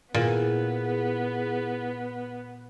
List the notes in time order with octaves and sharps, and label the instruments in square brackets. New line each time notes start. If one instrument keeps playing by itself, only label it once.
[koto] A#2 [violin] B3 [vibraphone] E4 G#4